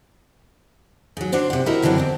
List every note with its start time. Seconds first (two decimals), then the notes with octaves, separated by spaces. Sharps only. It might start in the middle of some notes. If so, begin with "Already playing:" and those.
1.17 G#2 F#3
1.32 D3 D4 F#4 C5 C#5
1.50 C3 F#5
1.66 E4 F#4 G4 A#4 D#5 E5
1.82 F#2 D3 E3 F#3 C4 D4
1.96 E2 C4 D5